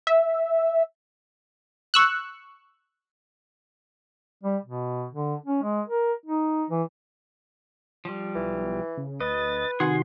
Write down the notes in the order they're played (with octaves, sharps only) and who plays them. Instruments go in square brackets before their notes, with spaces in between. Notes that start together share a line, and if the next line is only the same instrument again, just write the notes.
[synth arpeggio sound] E5
[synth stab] C#6 E6 F#6
[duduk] G3
B2
D3
C#4
G#3
A#4
D#4
E3
[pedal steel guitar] F3 G3
[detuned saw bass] B1 [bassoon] E3
[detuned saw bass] C#3
[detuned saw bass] D2 [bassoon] B4 [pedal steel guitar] D#5 [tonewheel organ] A6
[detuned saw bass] C3 [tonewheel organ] D#3 F#4 C6 [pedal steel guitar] G#4 F#5 G#5